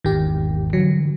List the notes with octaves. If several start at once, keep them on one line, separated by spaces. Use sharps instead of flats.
G#1 E2 D#3 G4
D3 E3 F#3 G3